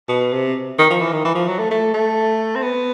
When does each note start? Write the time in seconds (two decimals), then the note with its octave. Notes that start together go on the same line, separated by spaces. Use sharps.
0.09 B2
0.33 C3
0.79 D#3
0.90 F3
1.01 E3
1.12 D#3
1.25 E3
1.35 F3
1.48 F#3
1.59 A3
1.71 A3
1.94 A3
2.55 C4
2.63 B3